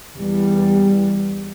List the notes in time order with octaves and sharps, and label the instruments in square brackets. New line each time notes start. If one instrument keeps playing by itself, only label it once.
[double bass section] E2 G3